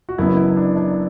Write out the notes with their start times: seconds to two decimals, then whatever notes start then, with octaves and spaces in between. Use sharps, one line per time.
0.09 F#4
0.18 F#1 F#2 F#3 B3 E4
0.37 E4
0.57 D4
0.76 D4